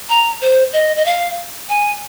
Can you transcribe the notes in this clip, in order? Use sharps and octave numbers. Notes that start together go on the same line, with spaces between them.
A#5
C5
D#5
D#5
F5
G#5